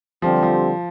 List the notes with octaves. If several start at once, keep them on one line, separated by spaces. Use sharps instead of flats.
D3 F3 G3 C4 G4
F3